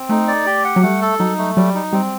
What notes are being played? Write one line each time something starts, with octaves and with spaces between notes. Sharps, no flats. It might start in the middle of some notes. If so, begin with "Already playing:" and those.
Already playing: C4
A3 D#4
D5
G4
F#5
F#3
G3 A3
A4
F#3 D#4
A3
F#3 G3
D#4
G3 C4